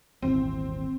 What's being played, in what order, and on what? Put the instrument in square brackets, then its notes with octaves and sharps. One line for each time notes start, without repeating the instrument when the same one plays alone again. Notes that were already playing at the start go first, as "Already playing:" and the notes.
[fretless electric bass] D#1 G#1 E2 [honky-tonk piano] C4